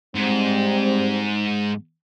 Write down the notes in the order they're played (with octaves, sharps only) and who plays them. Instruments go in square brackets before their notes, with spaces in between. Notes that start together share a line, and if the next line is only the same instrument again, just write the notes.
[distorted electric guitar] G#2 [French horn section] G3 C4